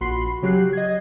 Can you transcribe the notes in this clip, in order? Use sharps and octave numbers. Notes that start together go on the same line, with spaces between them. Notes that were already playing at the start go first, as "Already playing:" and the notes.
A#1 F#4 B5 C6 C7
C#3 F#3 G4 F#6 C7
D#5 G#6